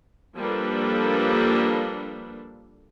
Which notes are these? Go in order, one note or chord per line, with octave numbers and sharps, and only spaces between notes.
F3 G3 A#3 D4 A4 B4